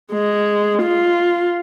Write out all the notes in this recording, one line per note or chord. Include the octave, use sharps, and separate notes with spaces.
G#3
F4